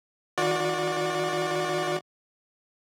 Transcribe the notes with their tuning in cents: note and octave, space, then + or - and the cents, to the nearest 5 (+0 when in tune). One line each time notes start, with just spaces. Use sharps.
D#3 +25 F#4 -35 D5 -5